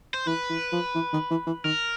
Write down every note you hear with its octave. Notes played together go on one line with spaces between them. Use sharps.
C5
E3 B4
E3
F3
E3
D#3
E3
E3
D#3 A#4